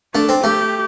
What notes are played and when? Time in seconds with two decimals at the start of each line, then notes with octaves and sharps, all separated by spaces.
0.14 A3 D4
0.29 C4
0.44 A3 G4